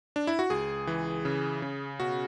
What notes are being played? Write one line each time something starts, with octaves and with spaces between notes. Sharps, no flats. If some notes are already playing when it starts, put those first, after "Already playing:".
D4
E4
F#4
C#2 G#4
E3
C#3
C#3
B2 F#4